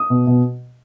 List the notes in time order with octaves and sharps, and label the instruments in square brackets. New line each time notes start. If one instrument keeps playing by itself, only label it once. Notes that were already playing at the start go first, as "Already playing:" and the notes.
Already playing: [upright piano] D#6
B2
B2